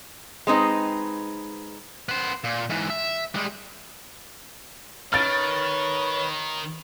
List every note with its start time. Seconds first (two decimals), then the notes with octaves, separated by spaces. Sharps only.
0.47 G#3 C4 D#4 B4
2.09 B3 C5
2.44 A#2
2.70 G#2 E3
2.90 E5
3.34 G3 G#3
5.13 D#3 B4 C#5 F6 A6 D7